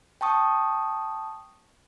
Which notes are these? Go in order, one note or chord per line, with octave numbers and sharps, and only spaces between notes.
G5 A5 C#6 D#6